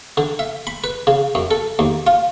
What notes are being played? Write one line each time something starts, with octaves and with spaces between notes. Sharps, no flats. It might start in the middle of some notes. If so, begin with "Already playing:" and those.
D3
E5
B5
B4
C#3
F#2
A4
D#2
F4